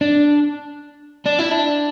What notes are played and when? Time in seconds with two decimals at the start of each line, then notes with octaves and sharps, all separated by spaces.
0.01 D4
1.26 D4
1.39 E4
1.52 D4